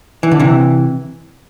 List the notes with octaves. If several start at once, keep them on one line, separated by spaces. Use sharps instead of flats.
E3
D3
C3 E3